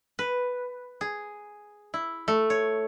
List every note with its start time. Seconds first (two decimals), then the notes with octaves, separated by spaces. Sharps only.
0.19 B4
1.01 G#4
1.94 E4
2.28 A3
2.50 C#5